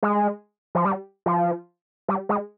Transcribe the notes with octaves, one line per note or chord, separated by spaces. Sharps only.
G#3
F3
G3
F3
G3
G#3